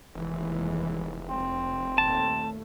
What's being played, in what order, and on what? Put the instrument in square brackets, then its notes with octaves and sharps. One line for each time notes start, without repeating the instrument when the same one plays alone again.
[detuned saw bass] F1 [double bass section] D#2 E3 G#3
[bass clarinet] C4
[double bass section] D#2 A#2 A3 [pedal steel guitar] A5